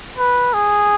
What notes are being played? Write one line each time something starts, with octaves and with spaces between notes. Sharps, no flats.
B4
G#4